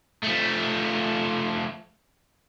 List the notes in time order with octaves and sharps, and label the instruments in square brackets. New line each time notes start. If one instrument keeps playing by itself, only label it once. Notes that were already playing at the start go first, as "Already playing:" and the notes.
[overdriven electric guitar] F3 A3